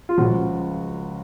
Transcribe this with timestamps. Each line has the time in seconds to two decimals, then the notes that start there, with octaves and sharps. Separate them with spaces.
0.09 F4
0.18 C#2 C#3 F3 F#4